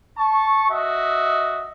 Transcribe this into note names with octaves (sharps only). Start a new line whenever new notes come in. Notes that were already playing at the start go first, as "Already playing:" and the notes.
A5 C#6
F#4 D#5 E5